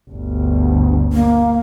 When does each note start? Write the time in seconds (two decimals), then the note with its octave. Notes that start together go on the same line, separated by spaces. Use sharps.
0.11 G1 D2
1.13 A#3